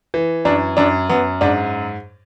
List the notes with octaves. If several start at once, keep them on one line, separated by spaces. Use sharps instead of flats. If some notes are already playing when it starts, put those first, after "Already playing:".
E3
F#2 D4
F#2 D4
F#2 B3
G#2 D4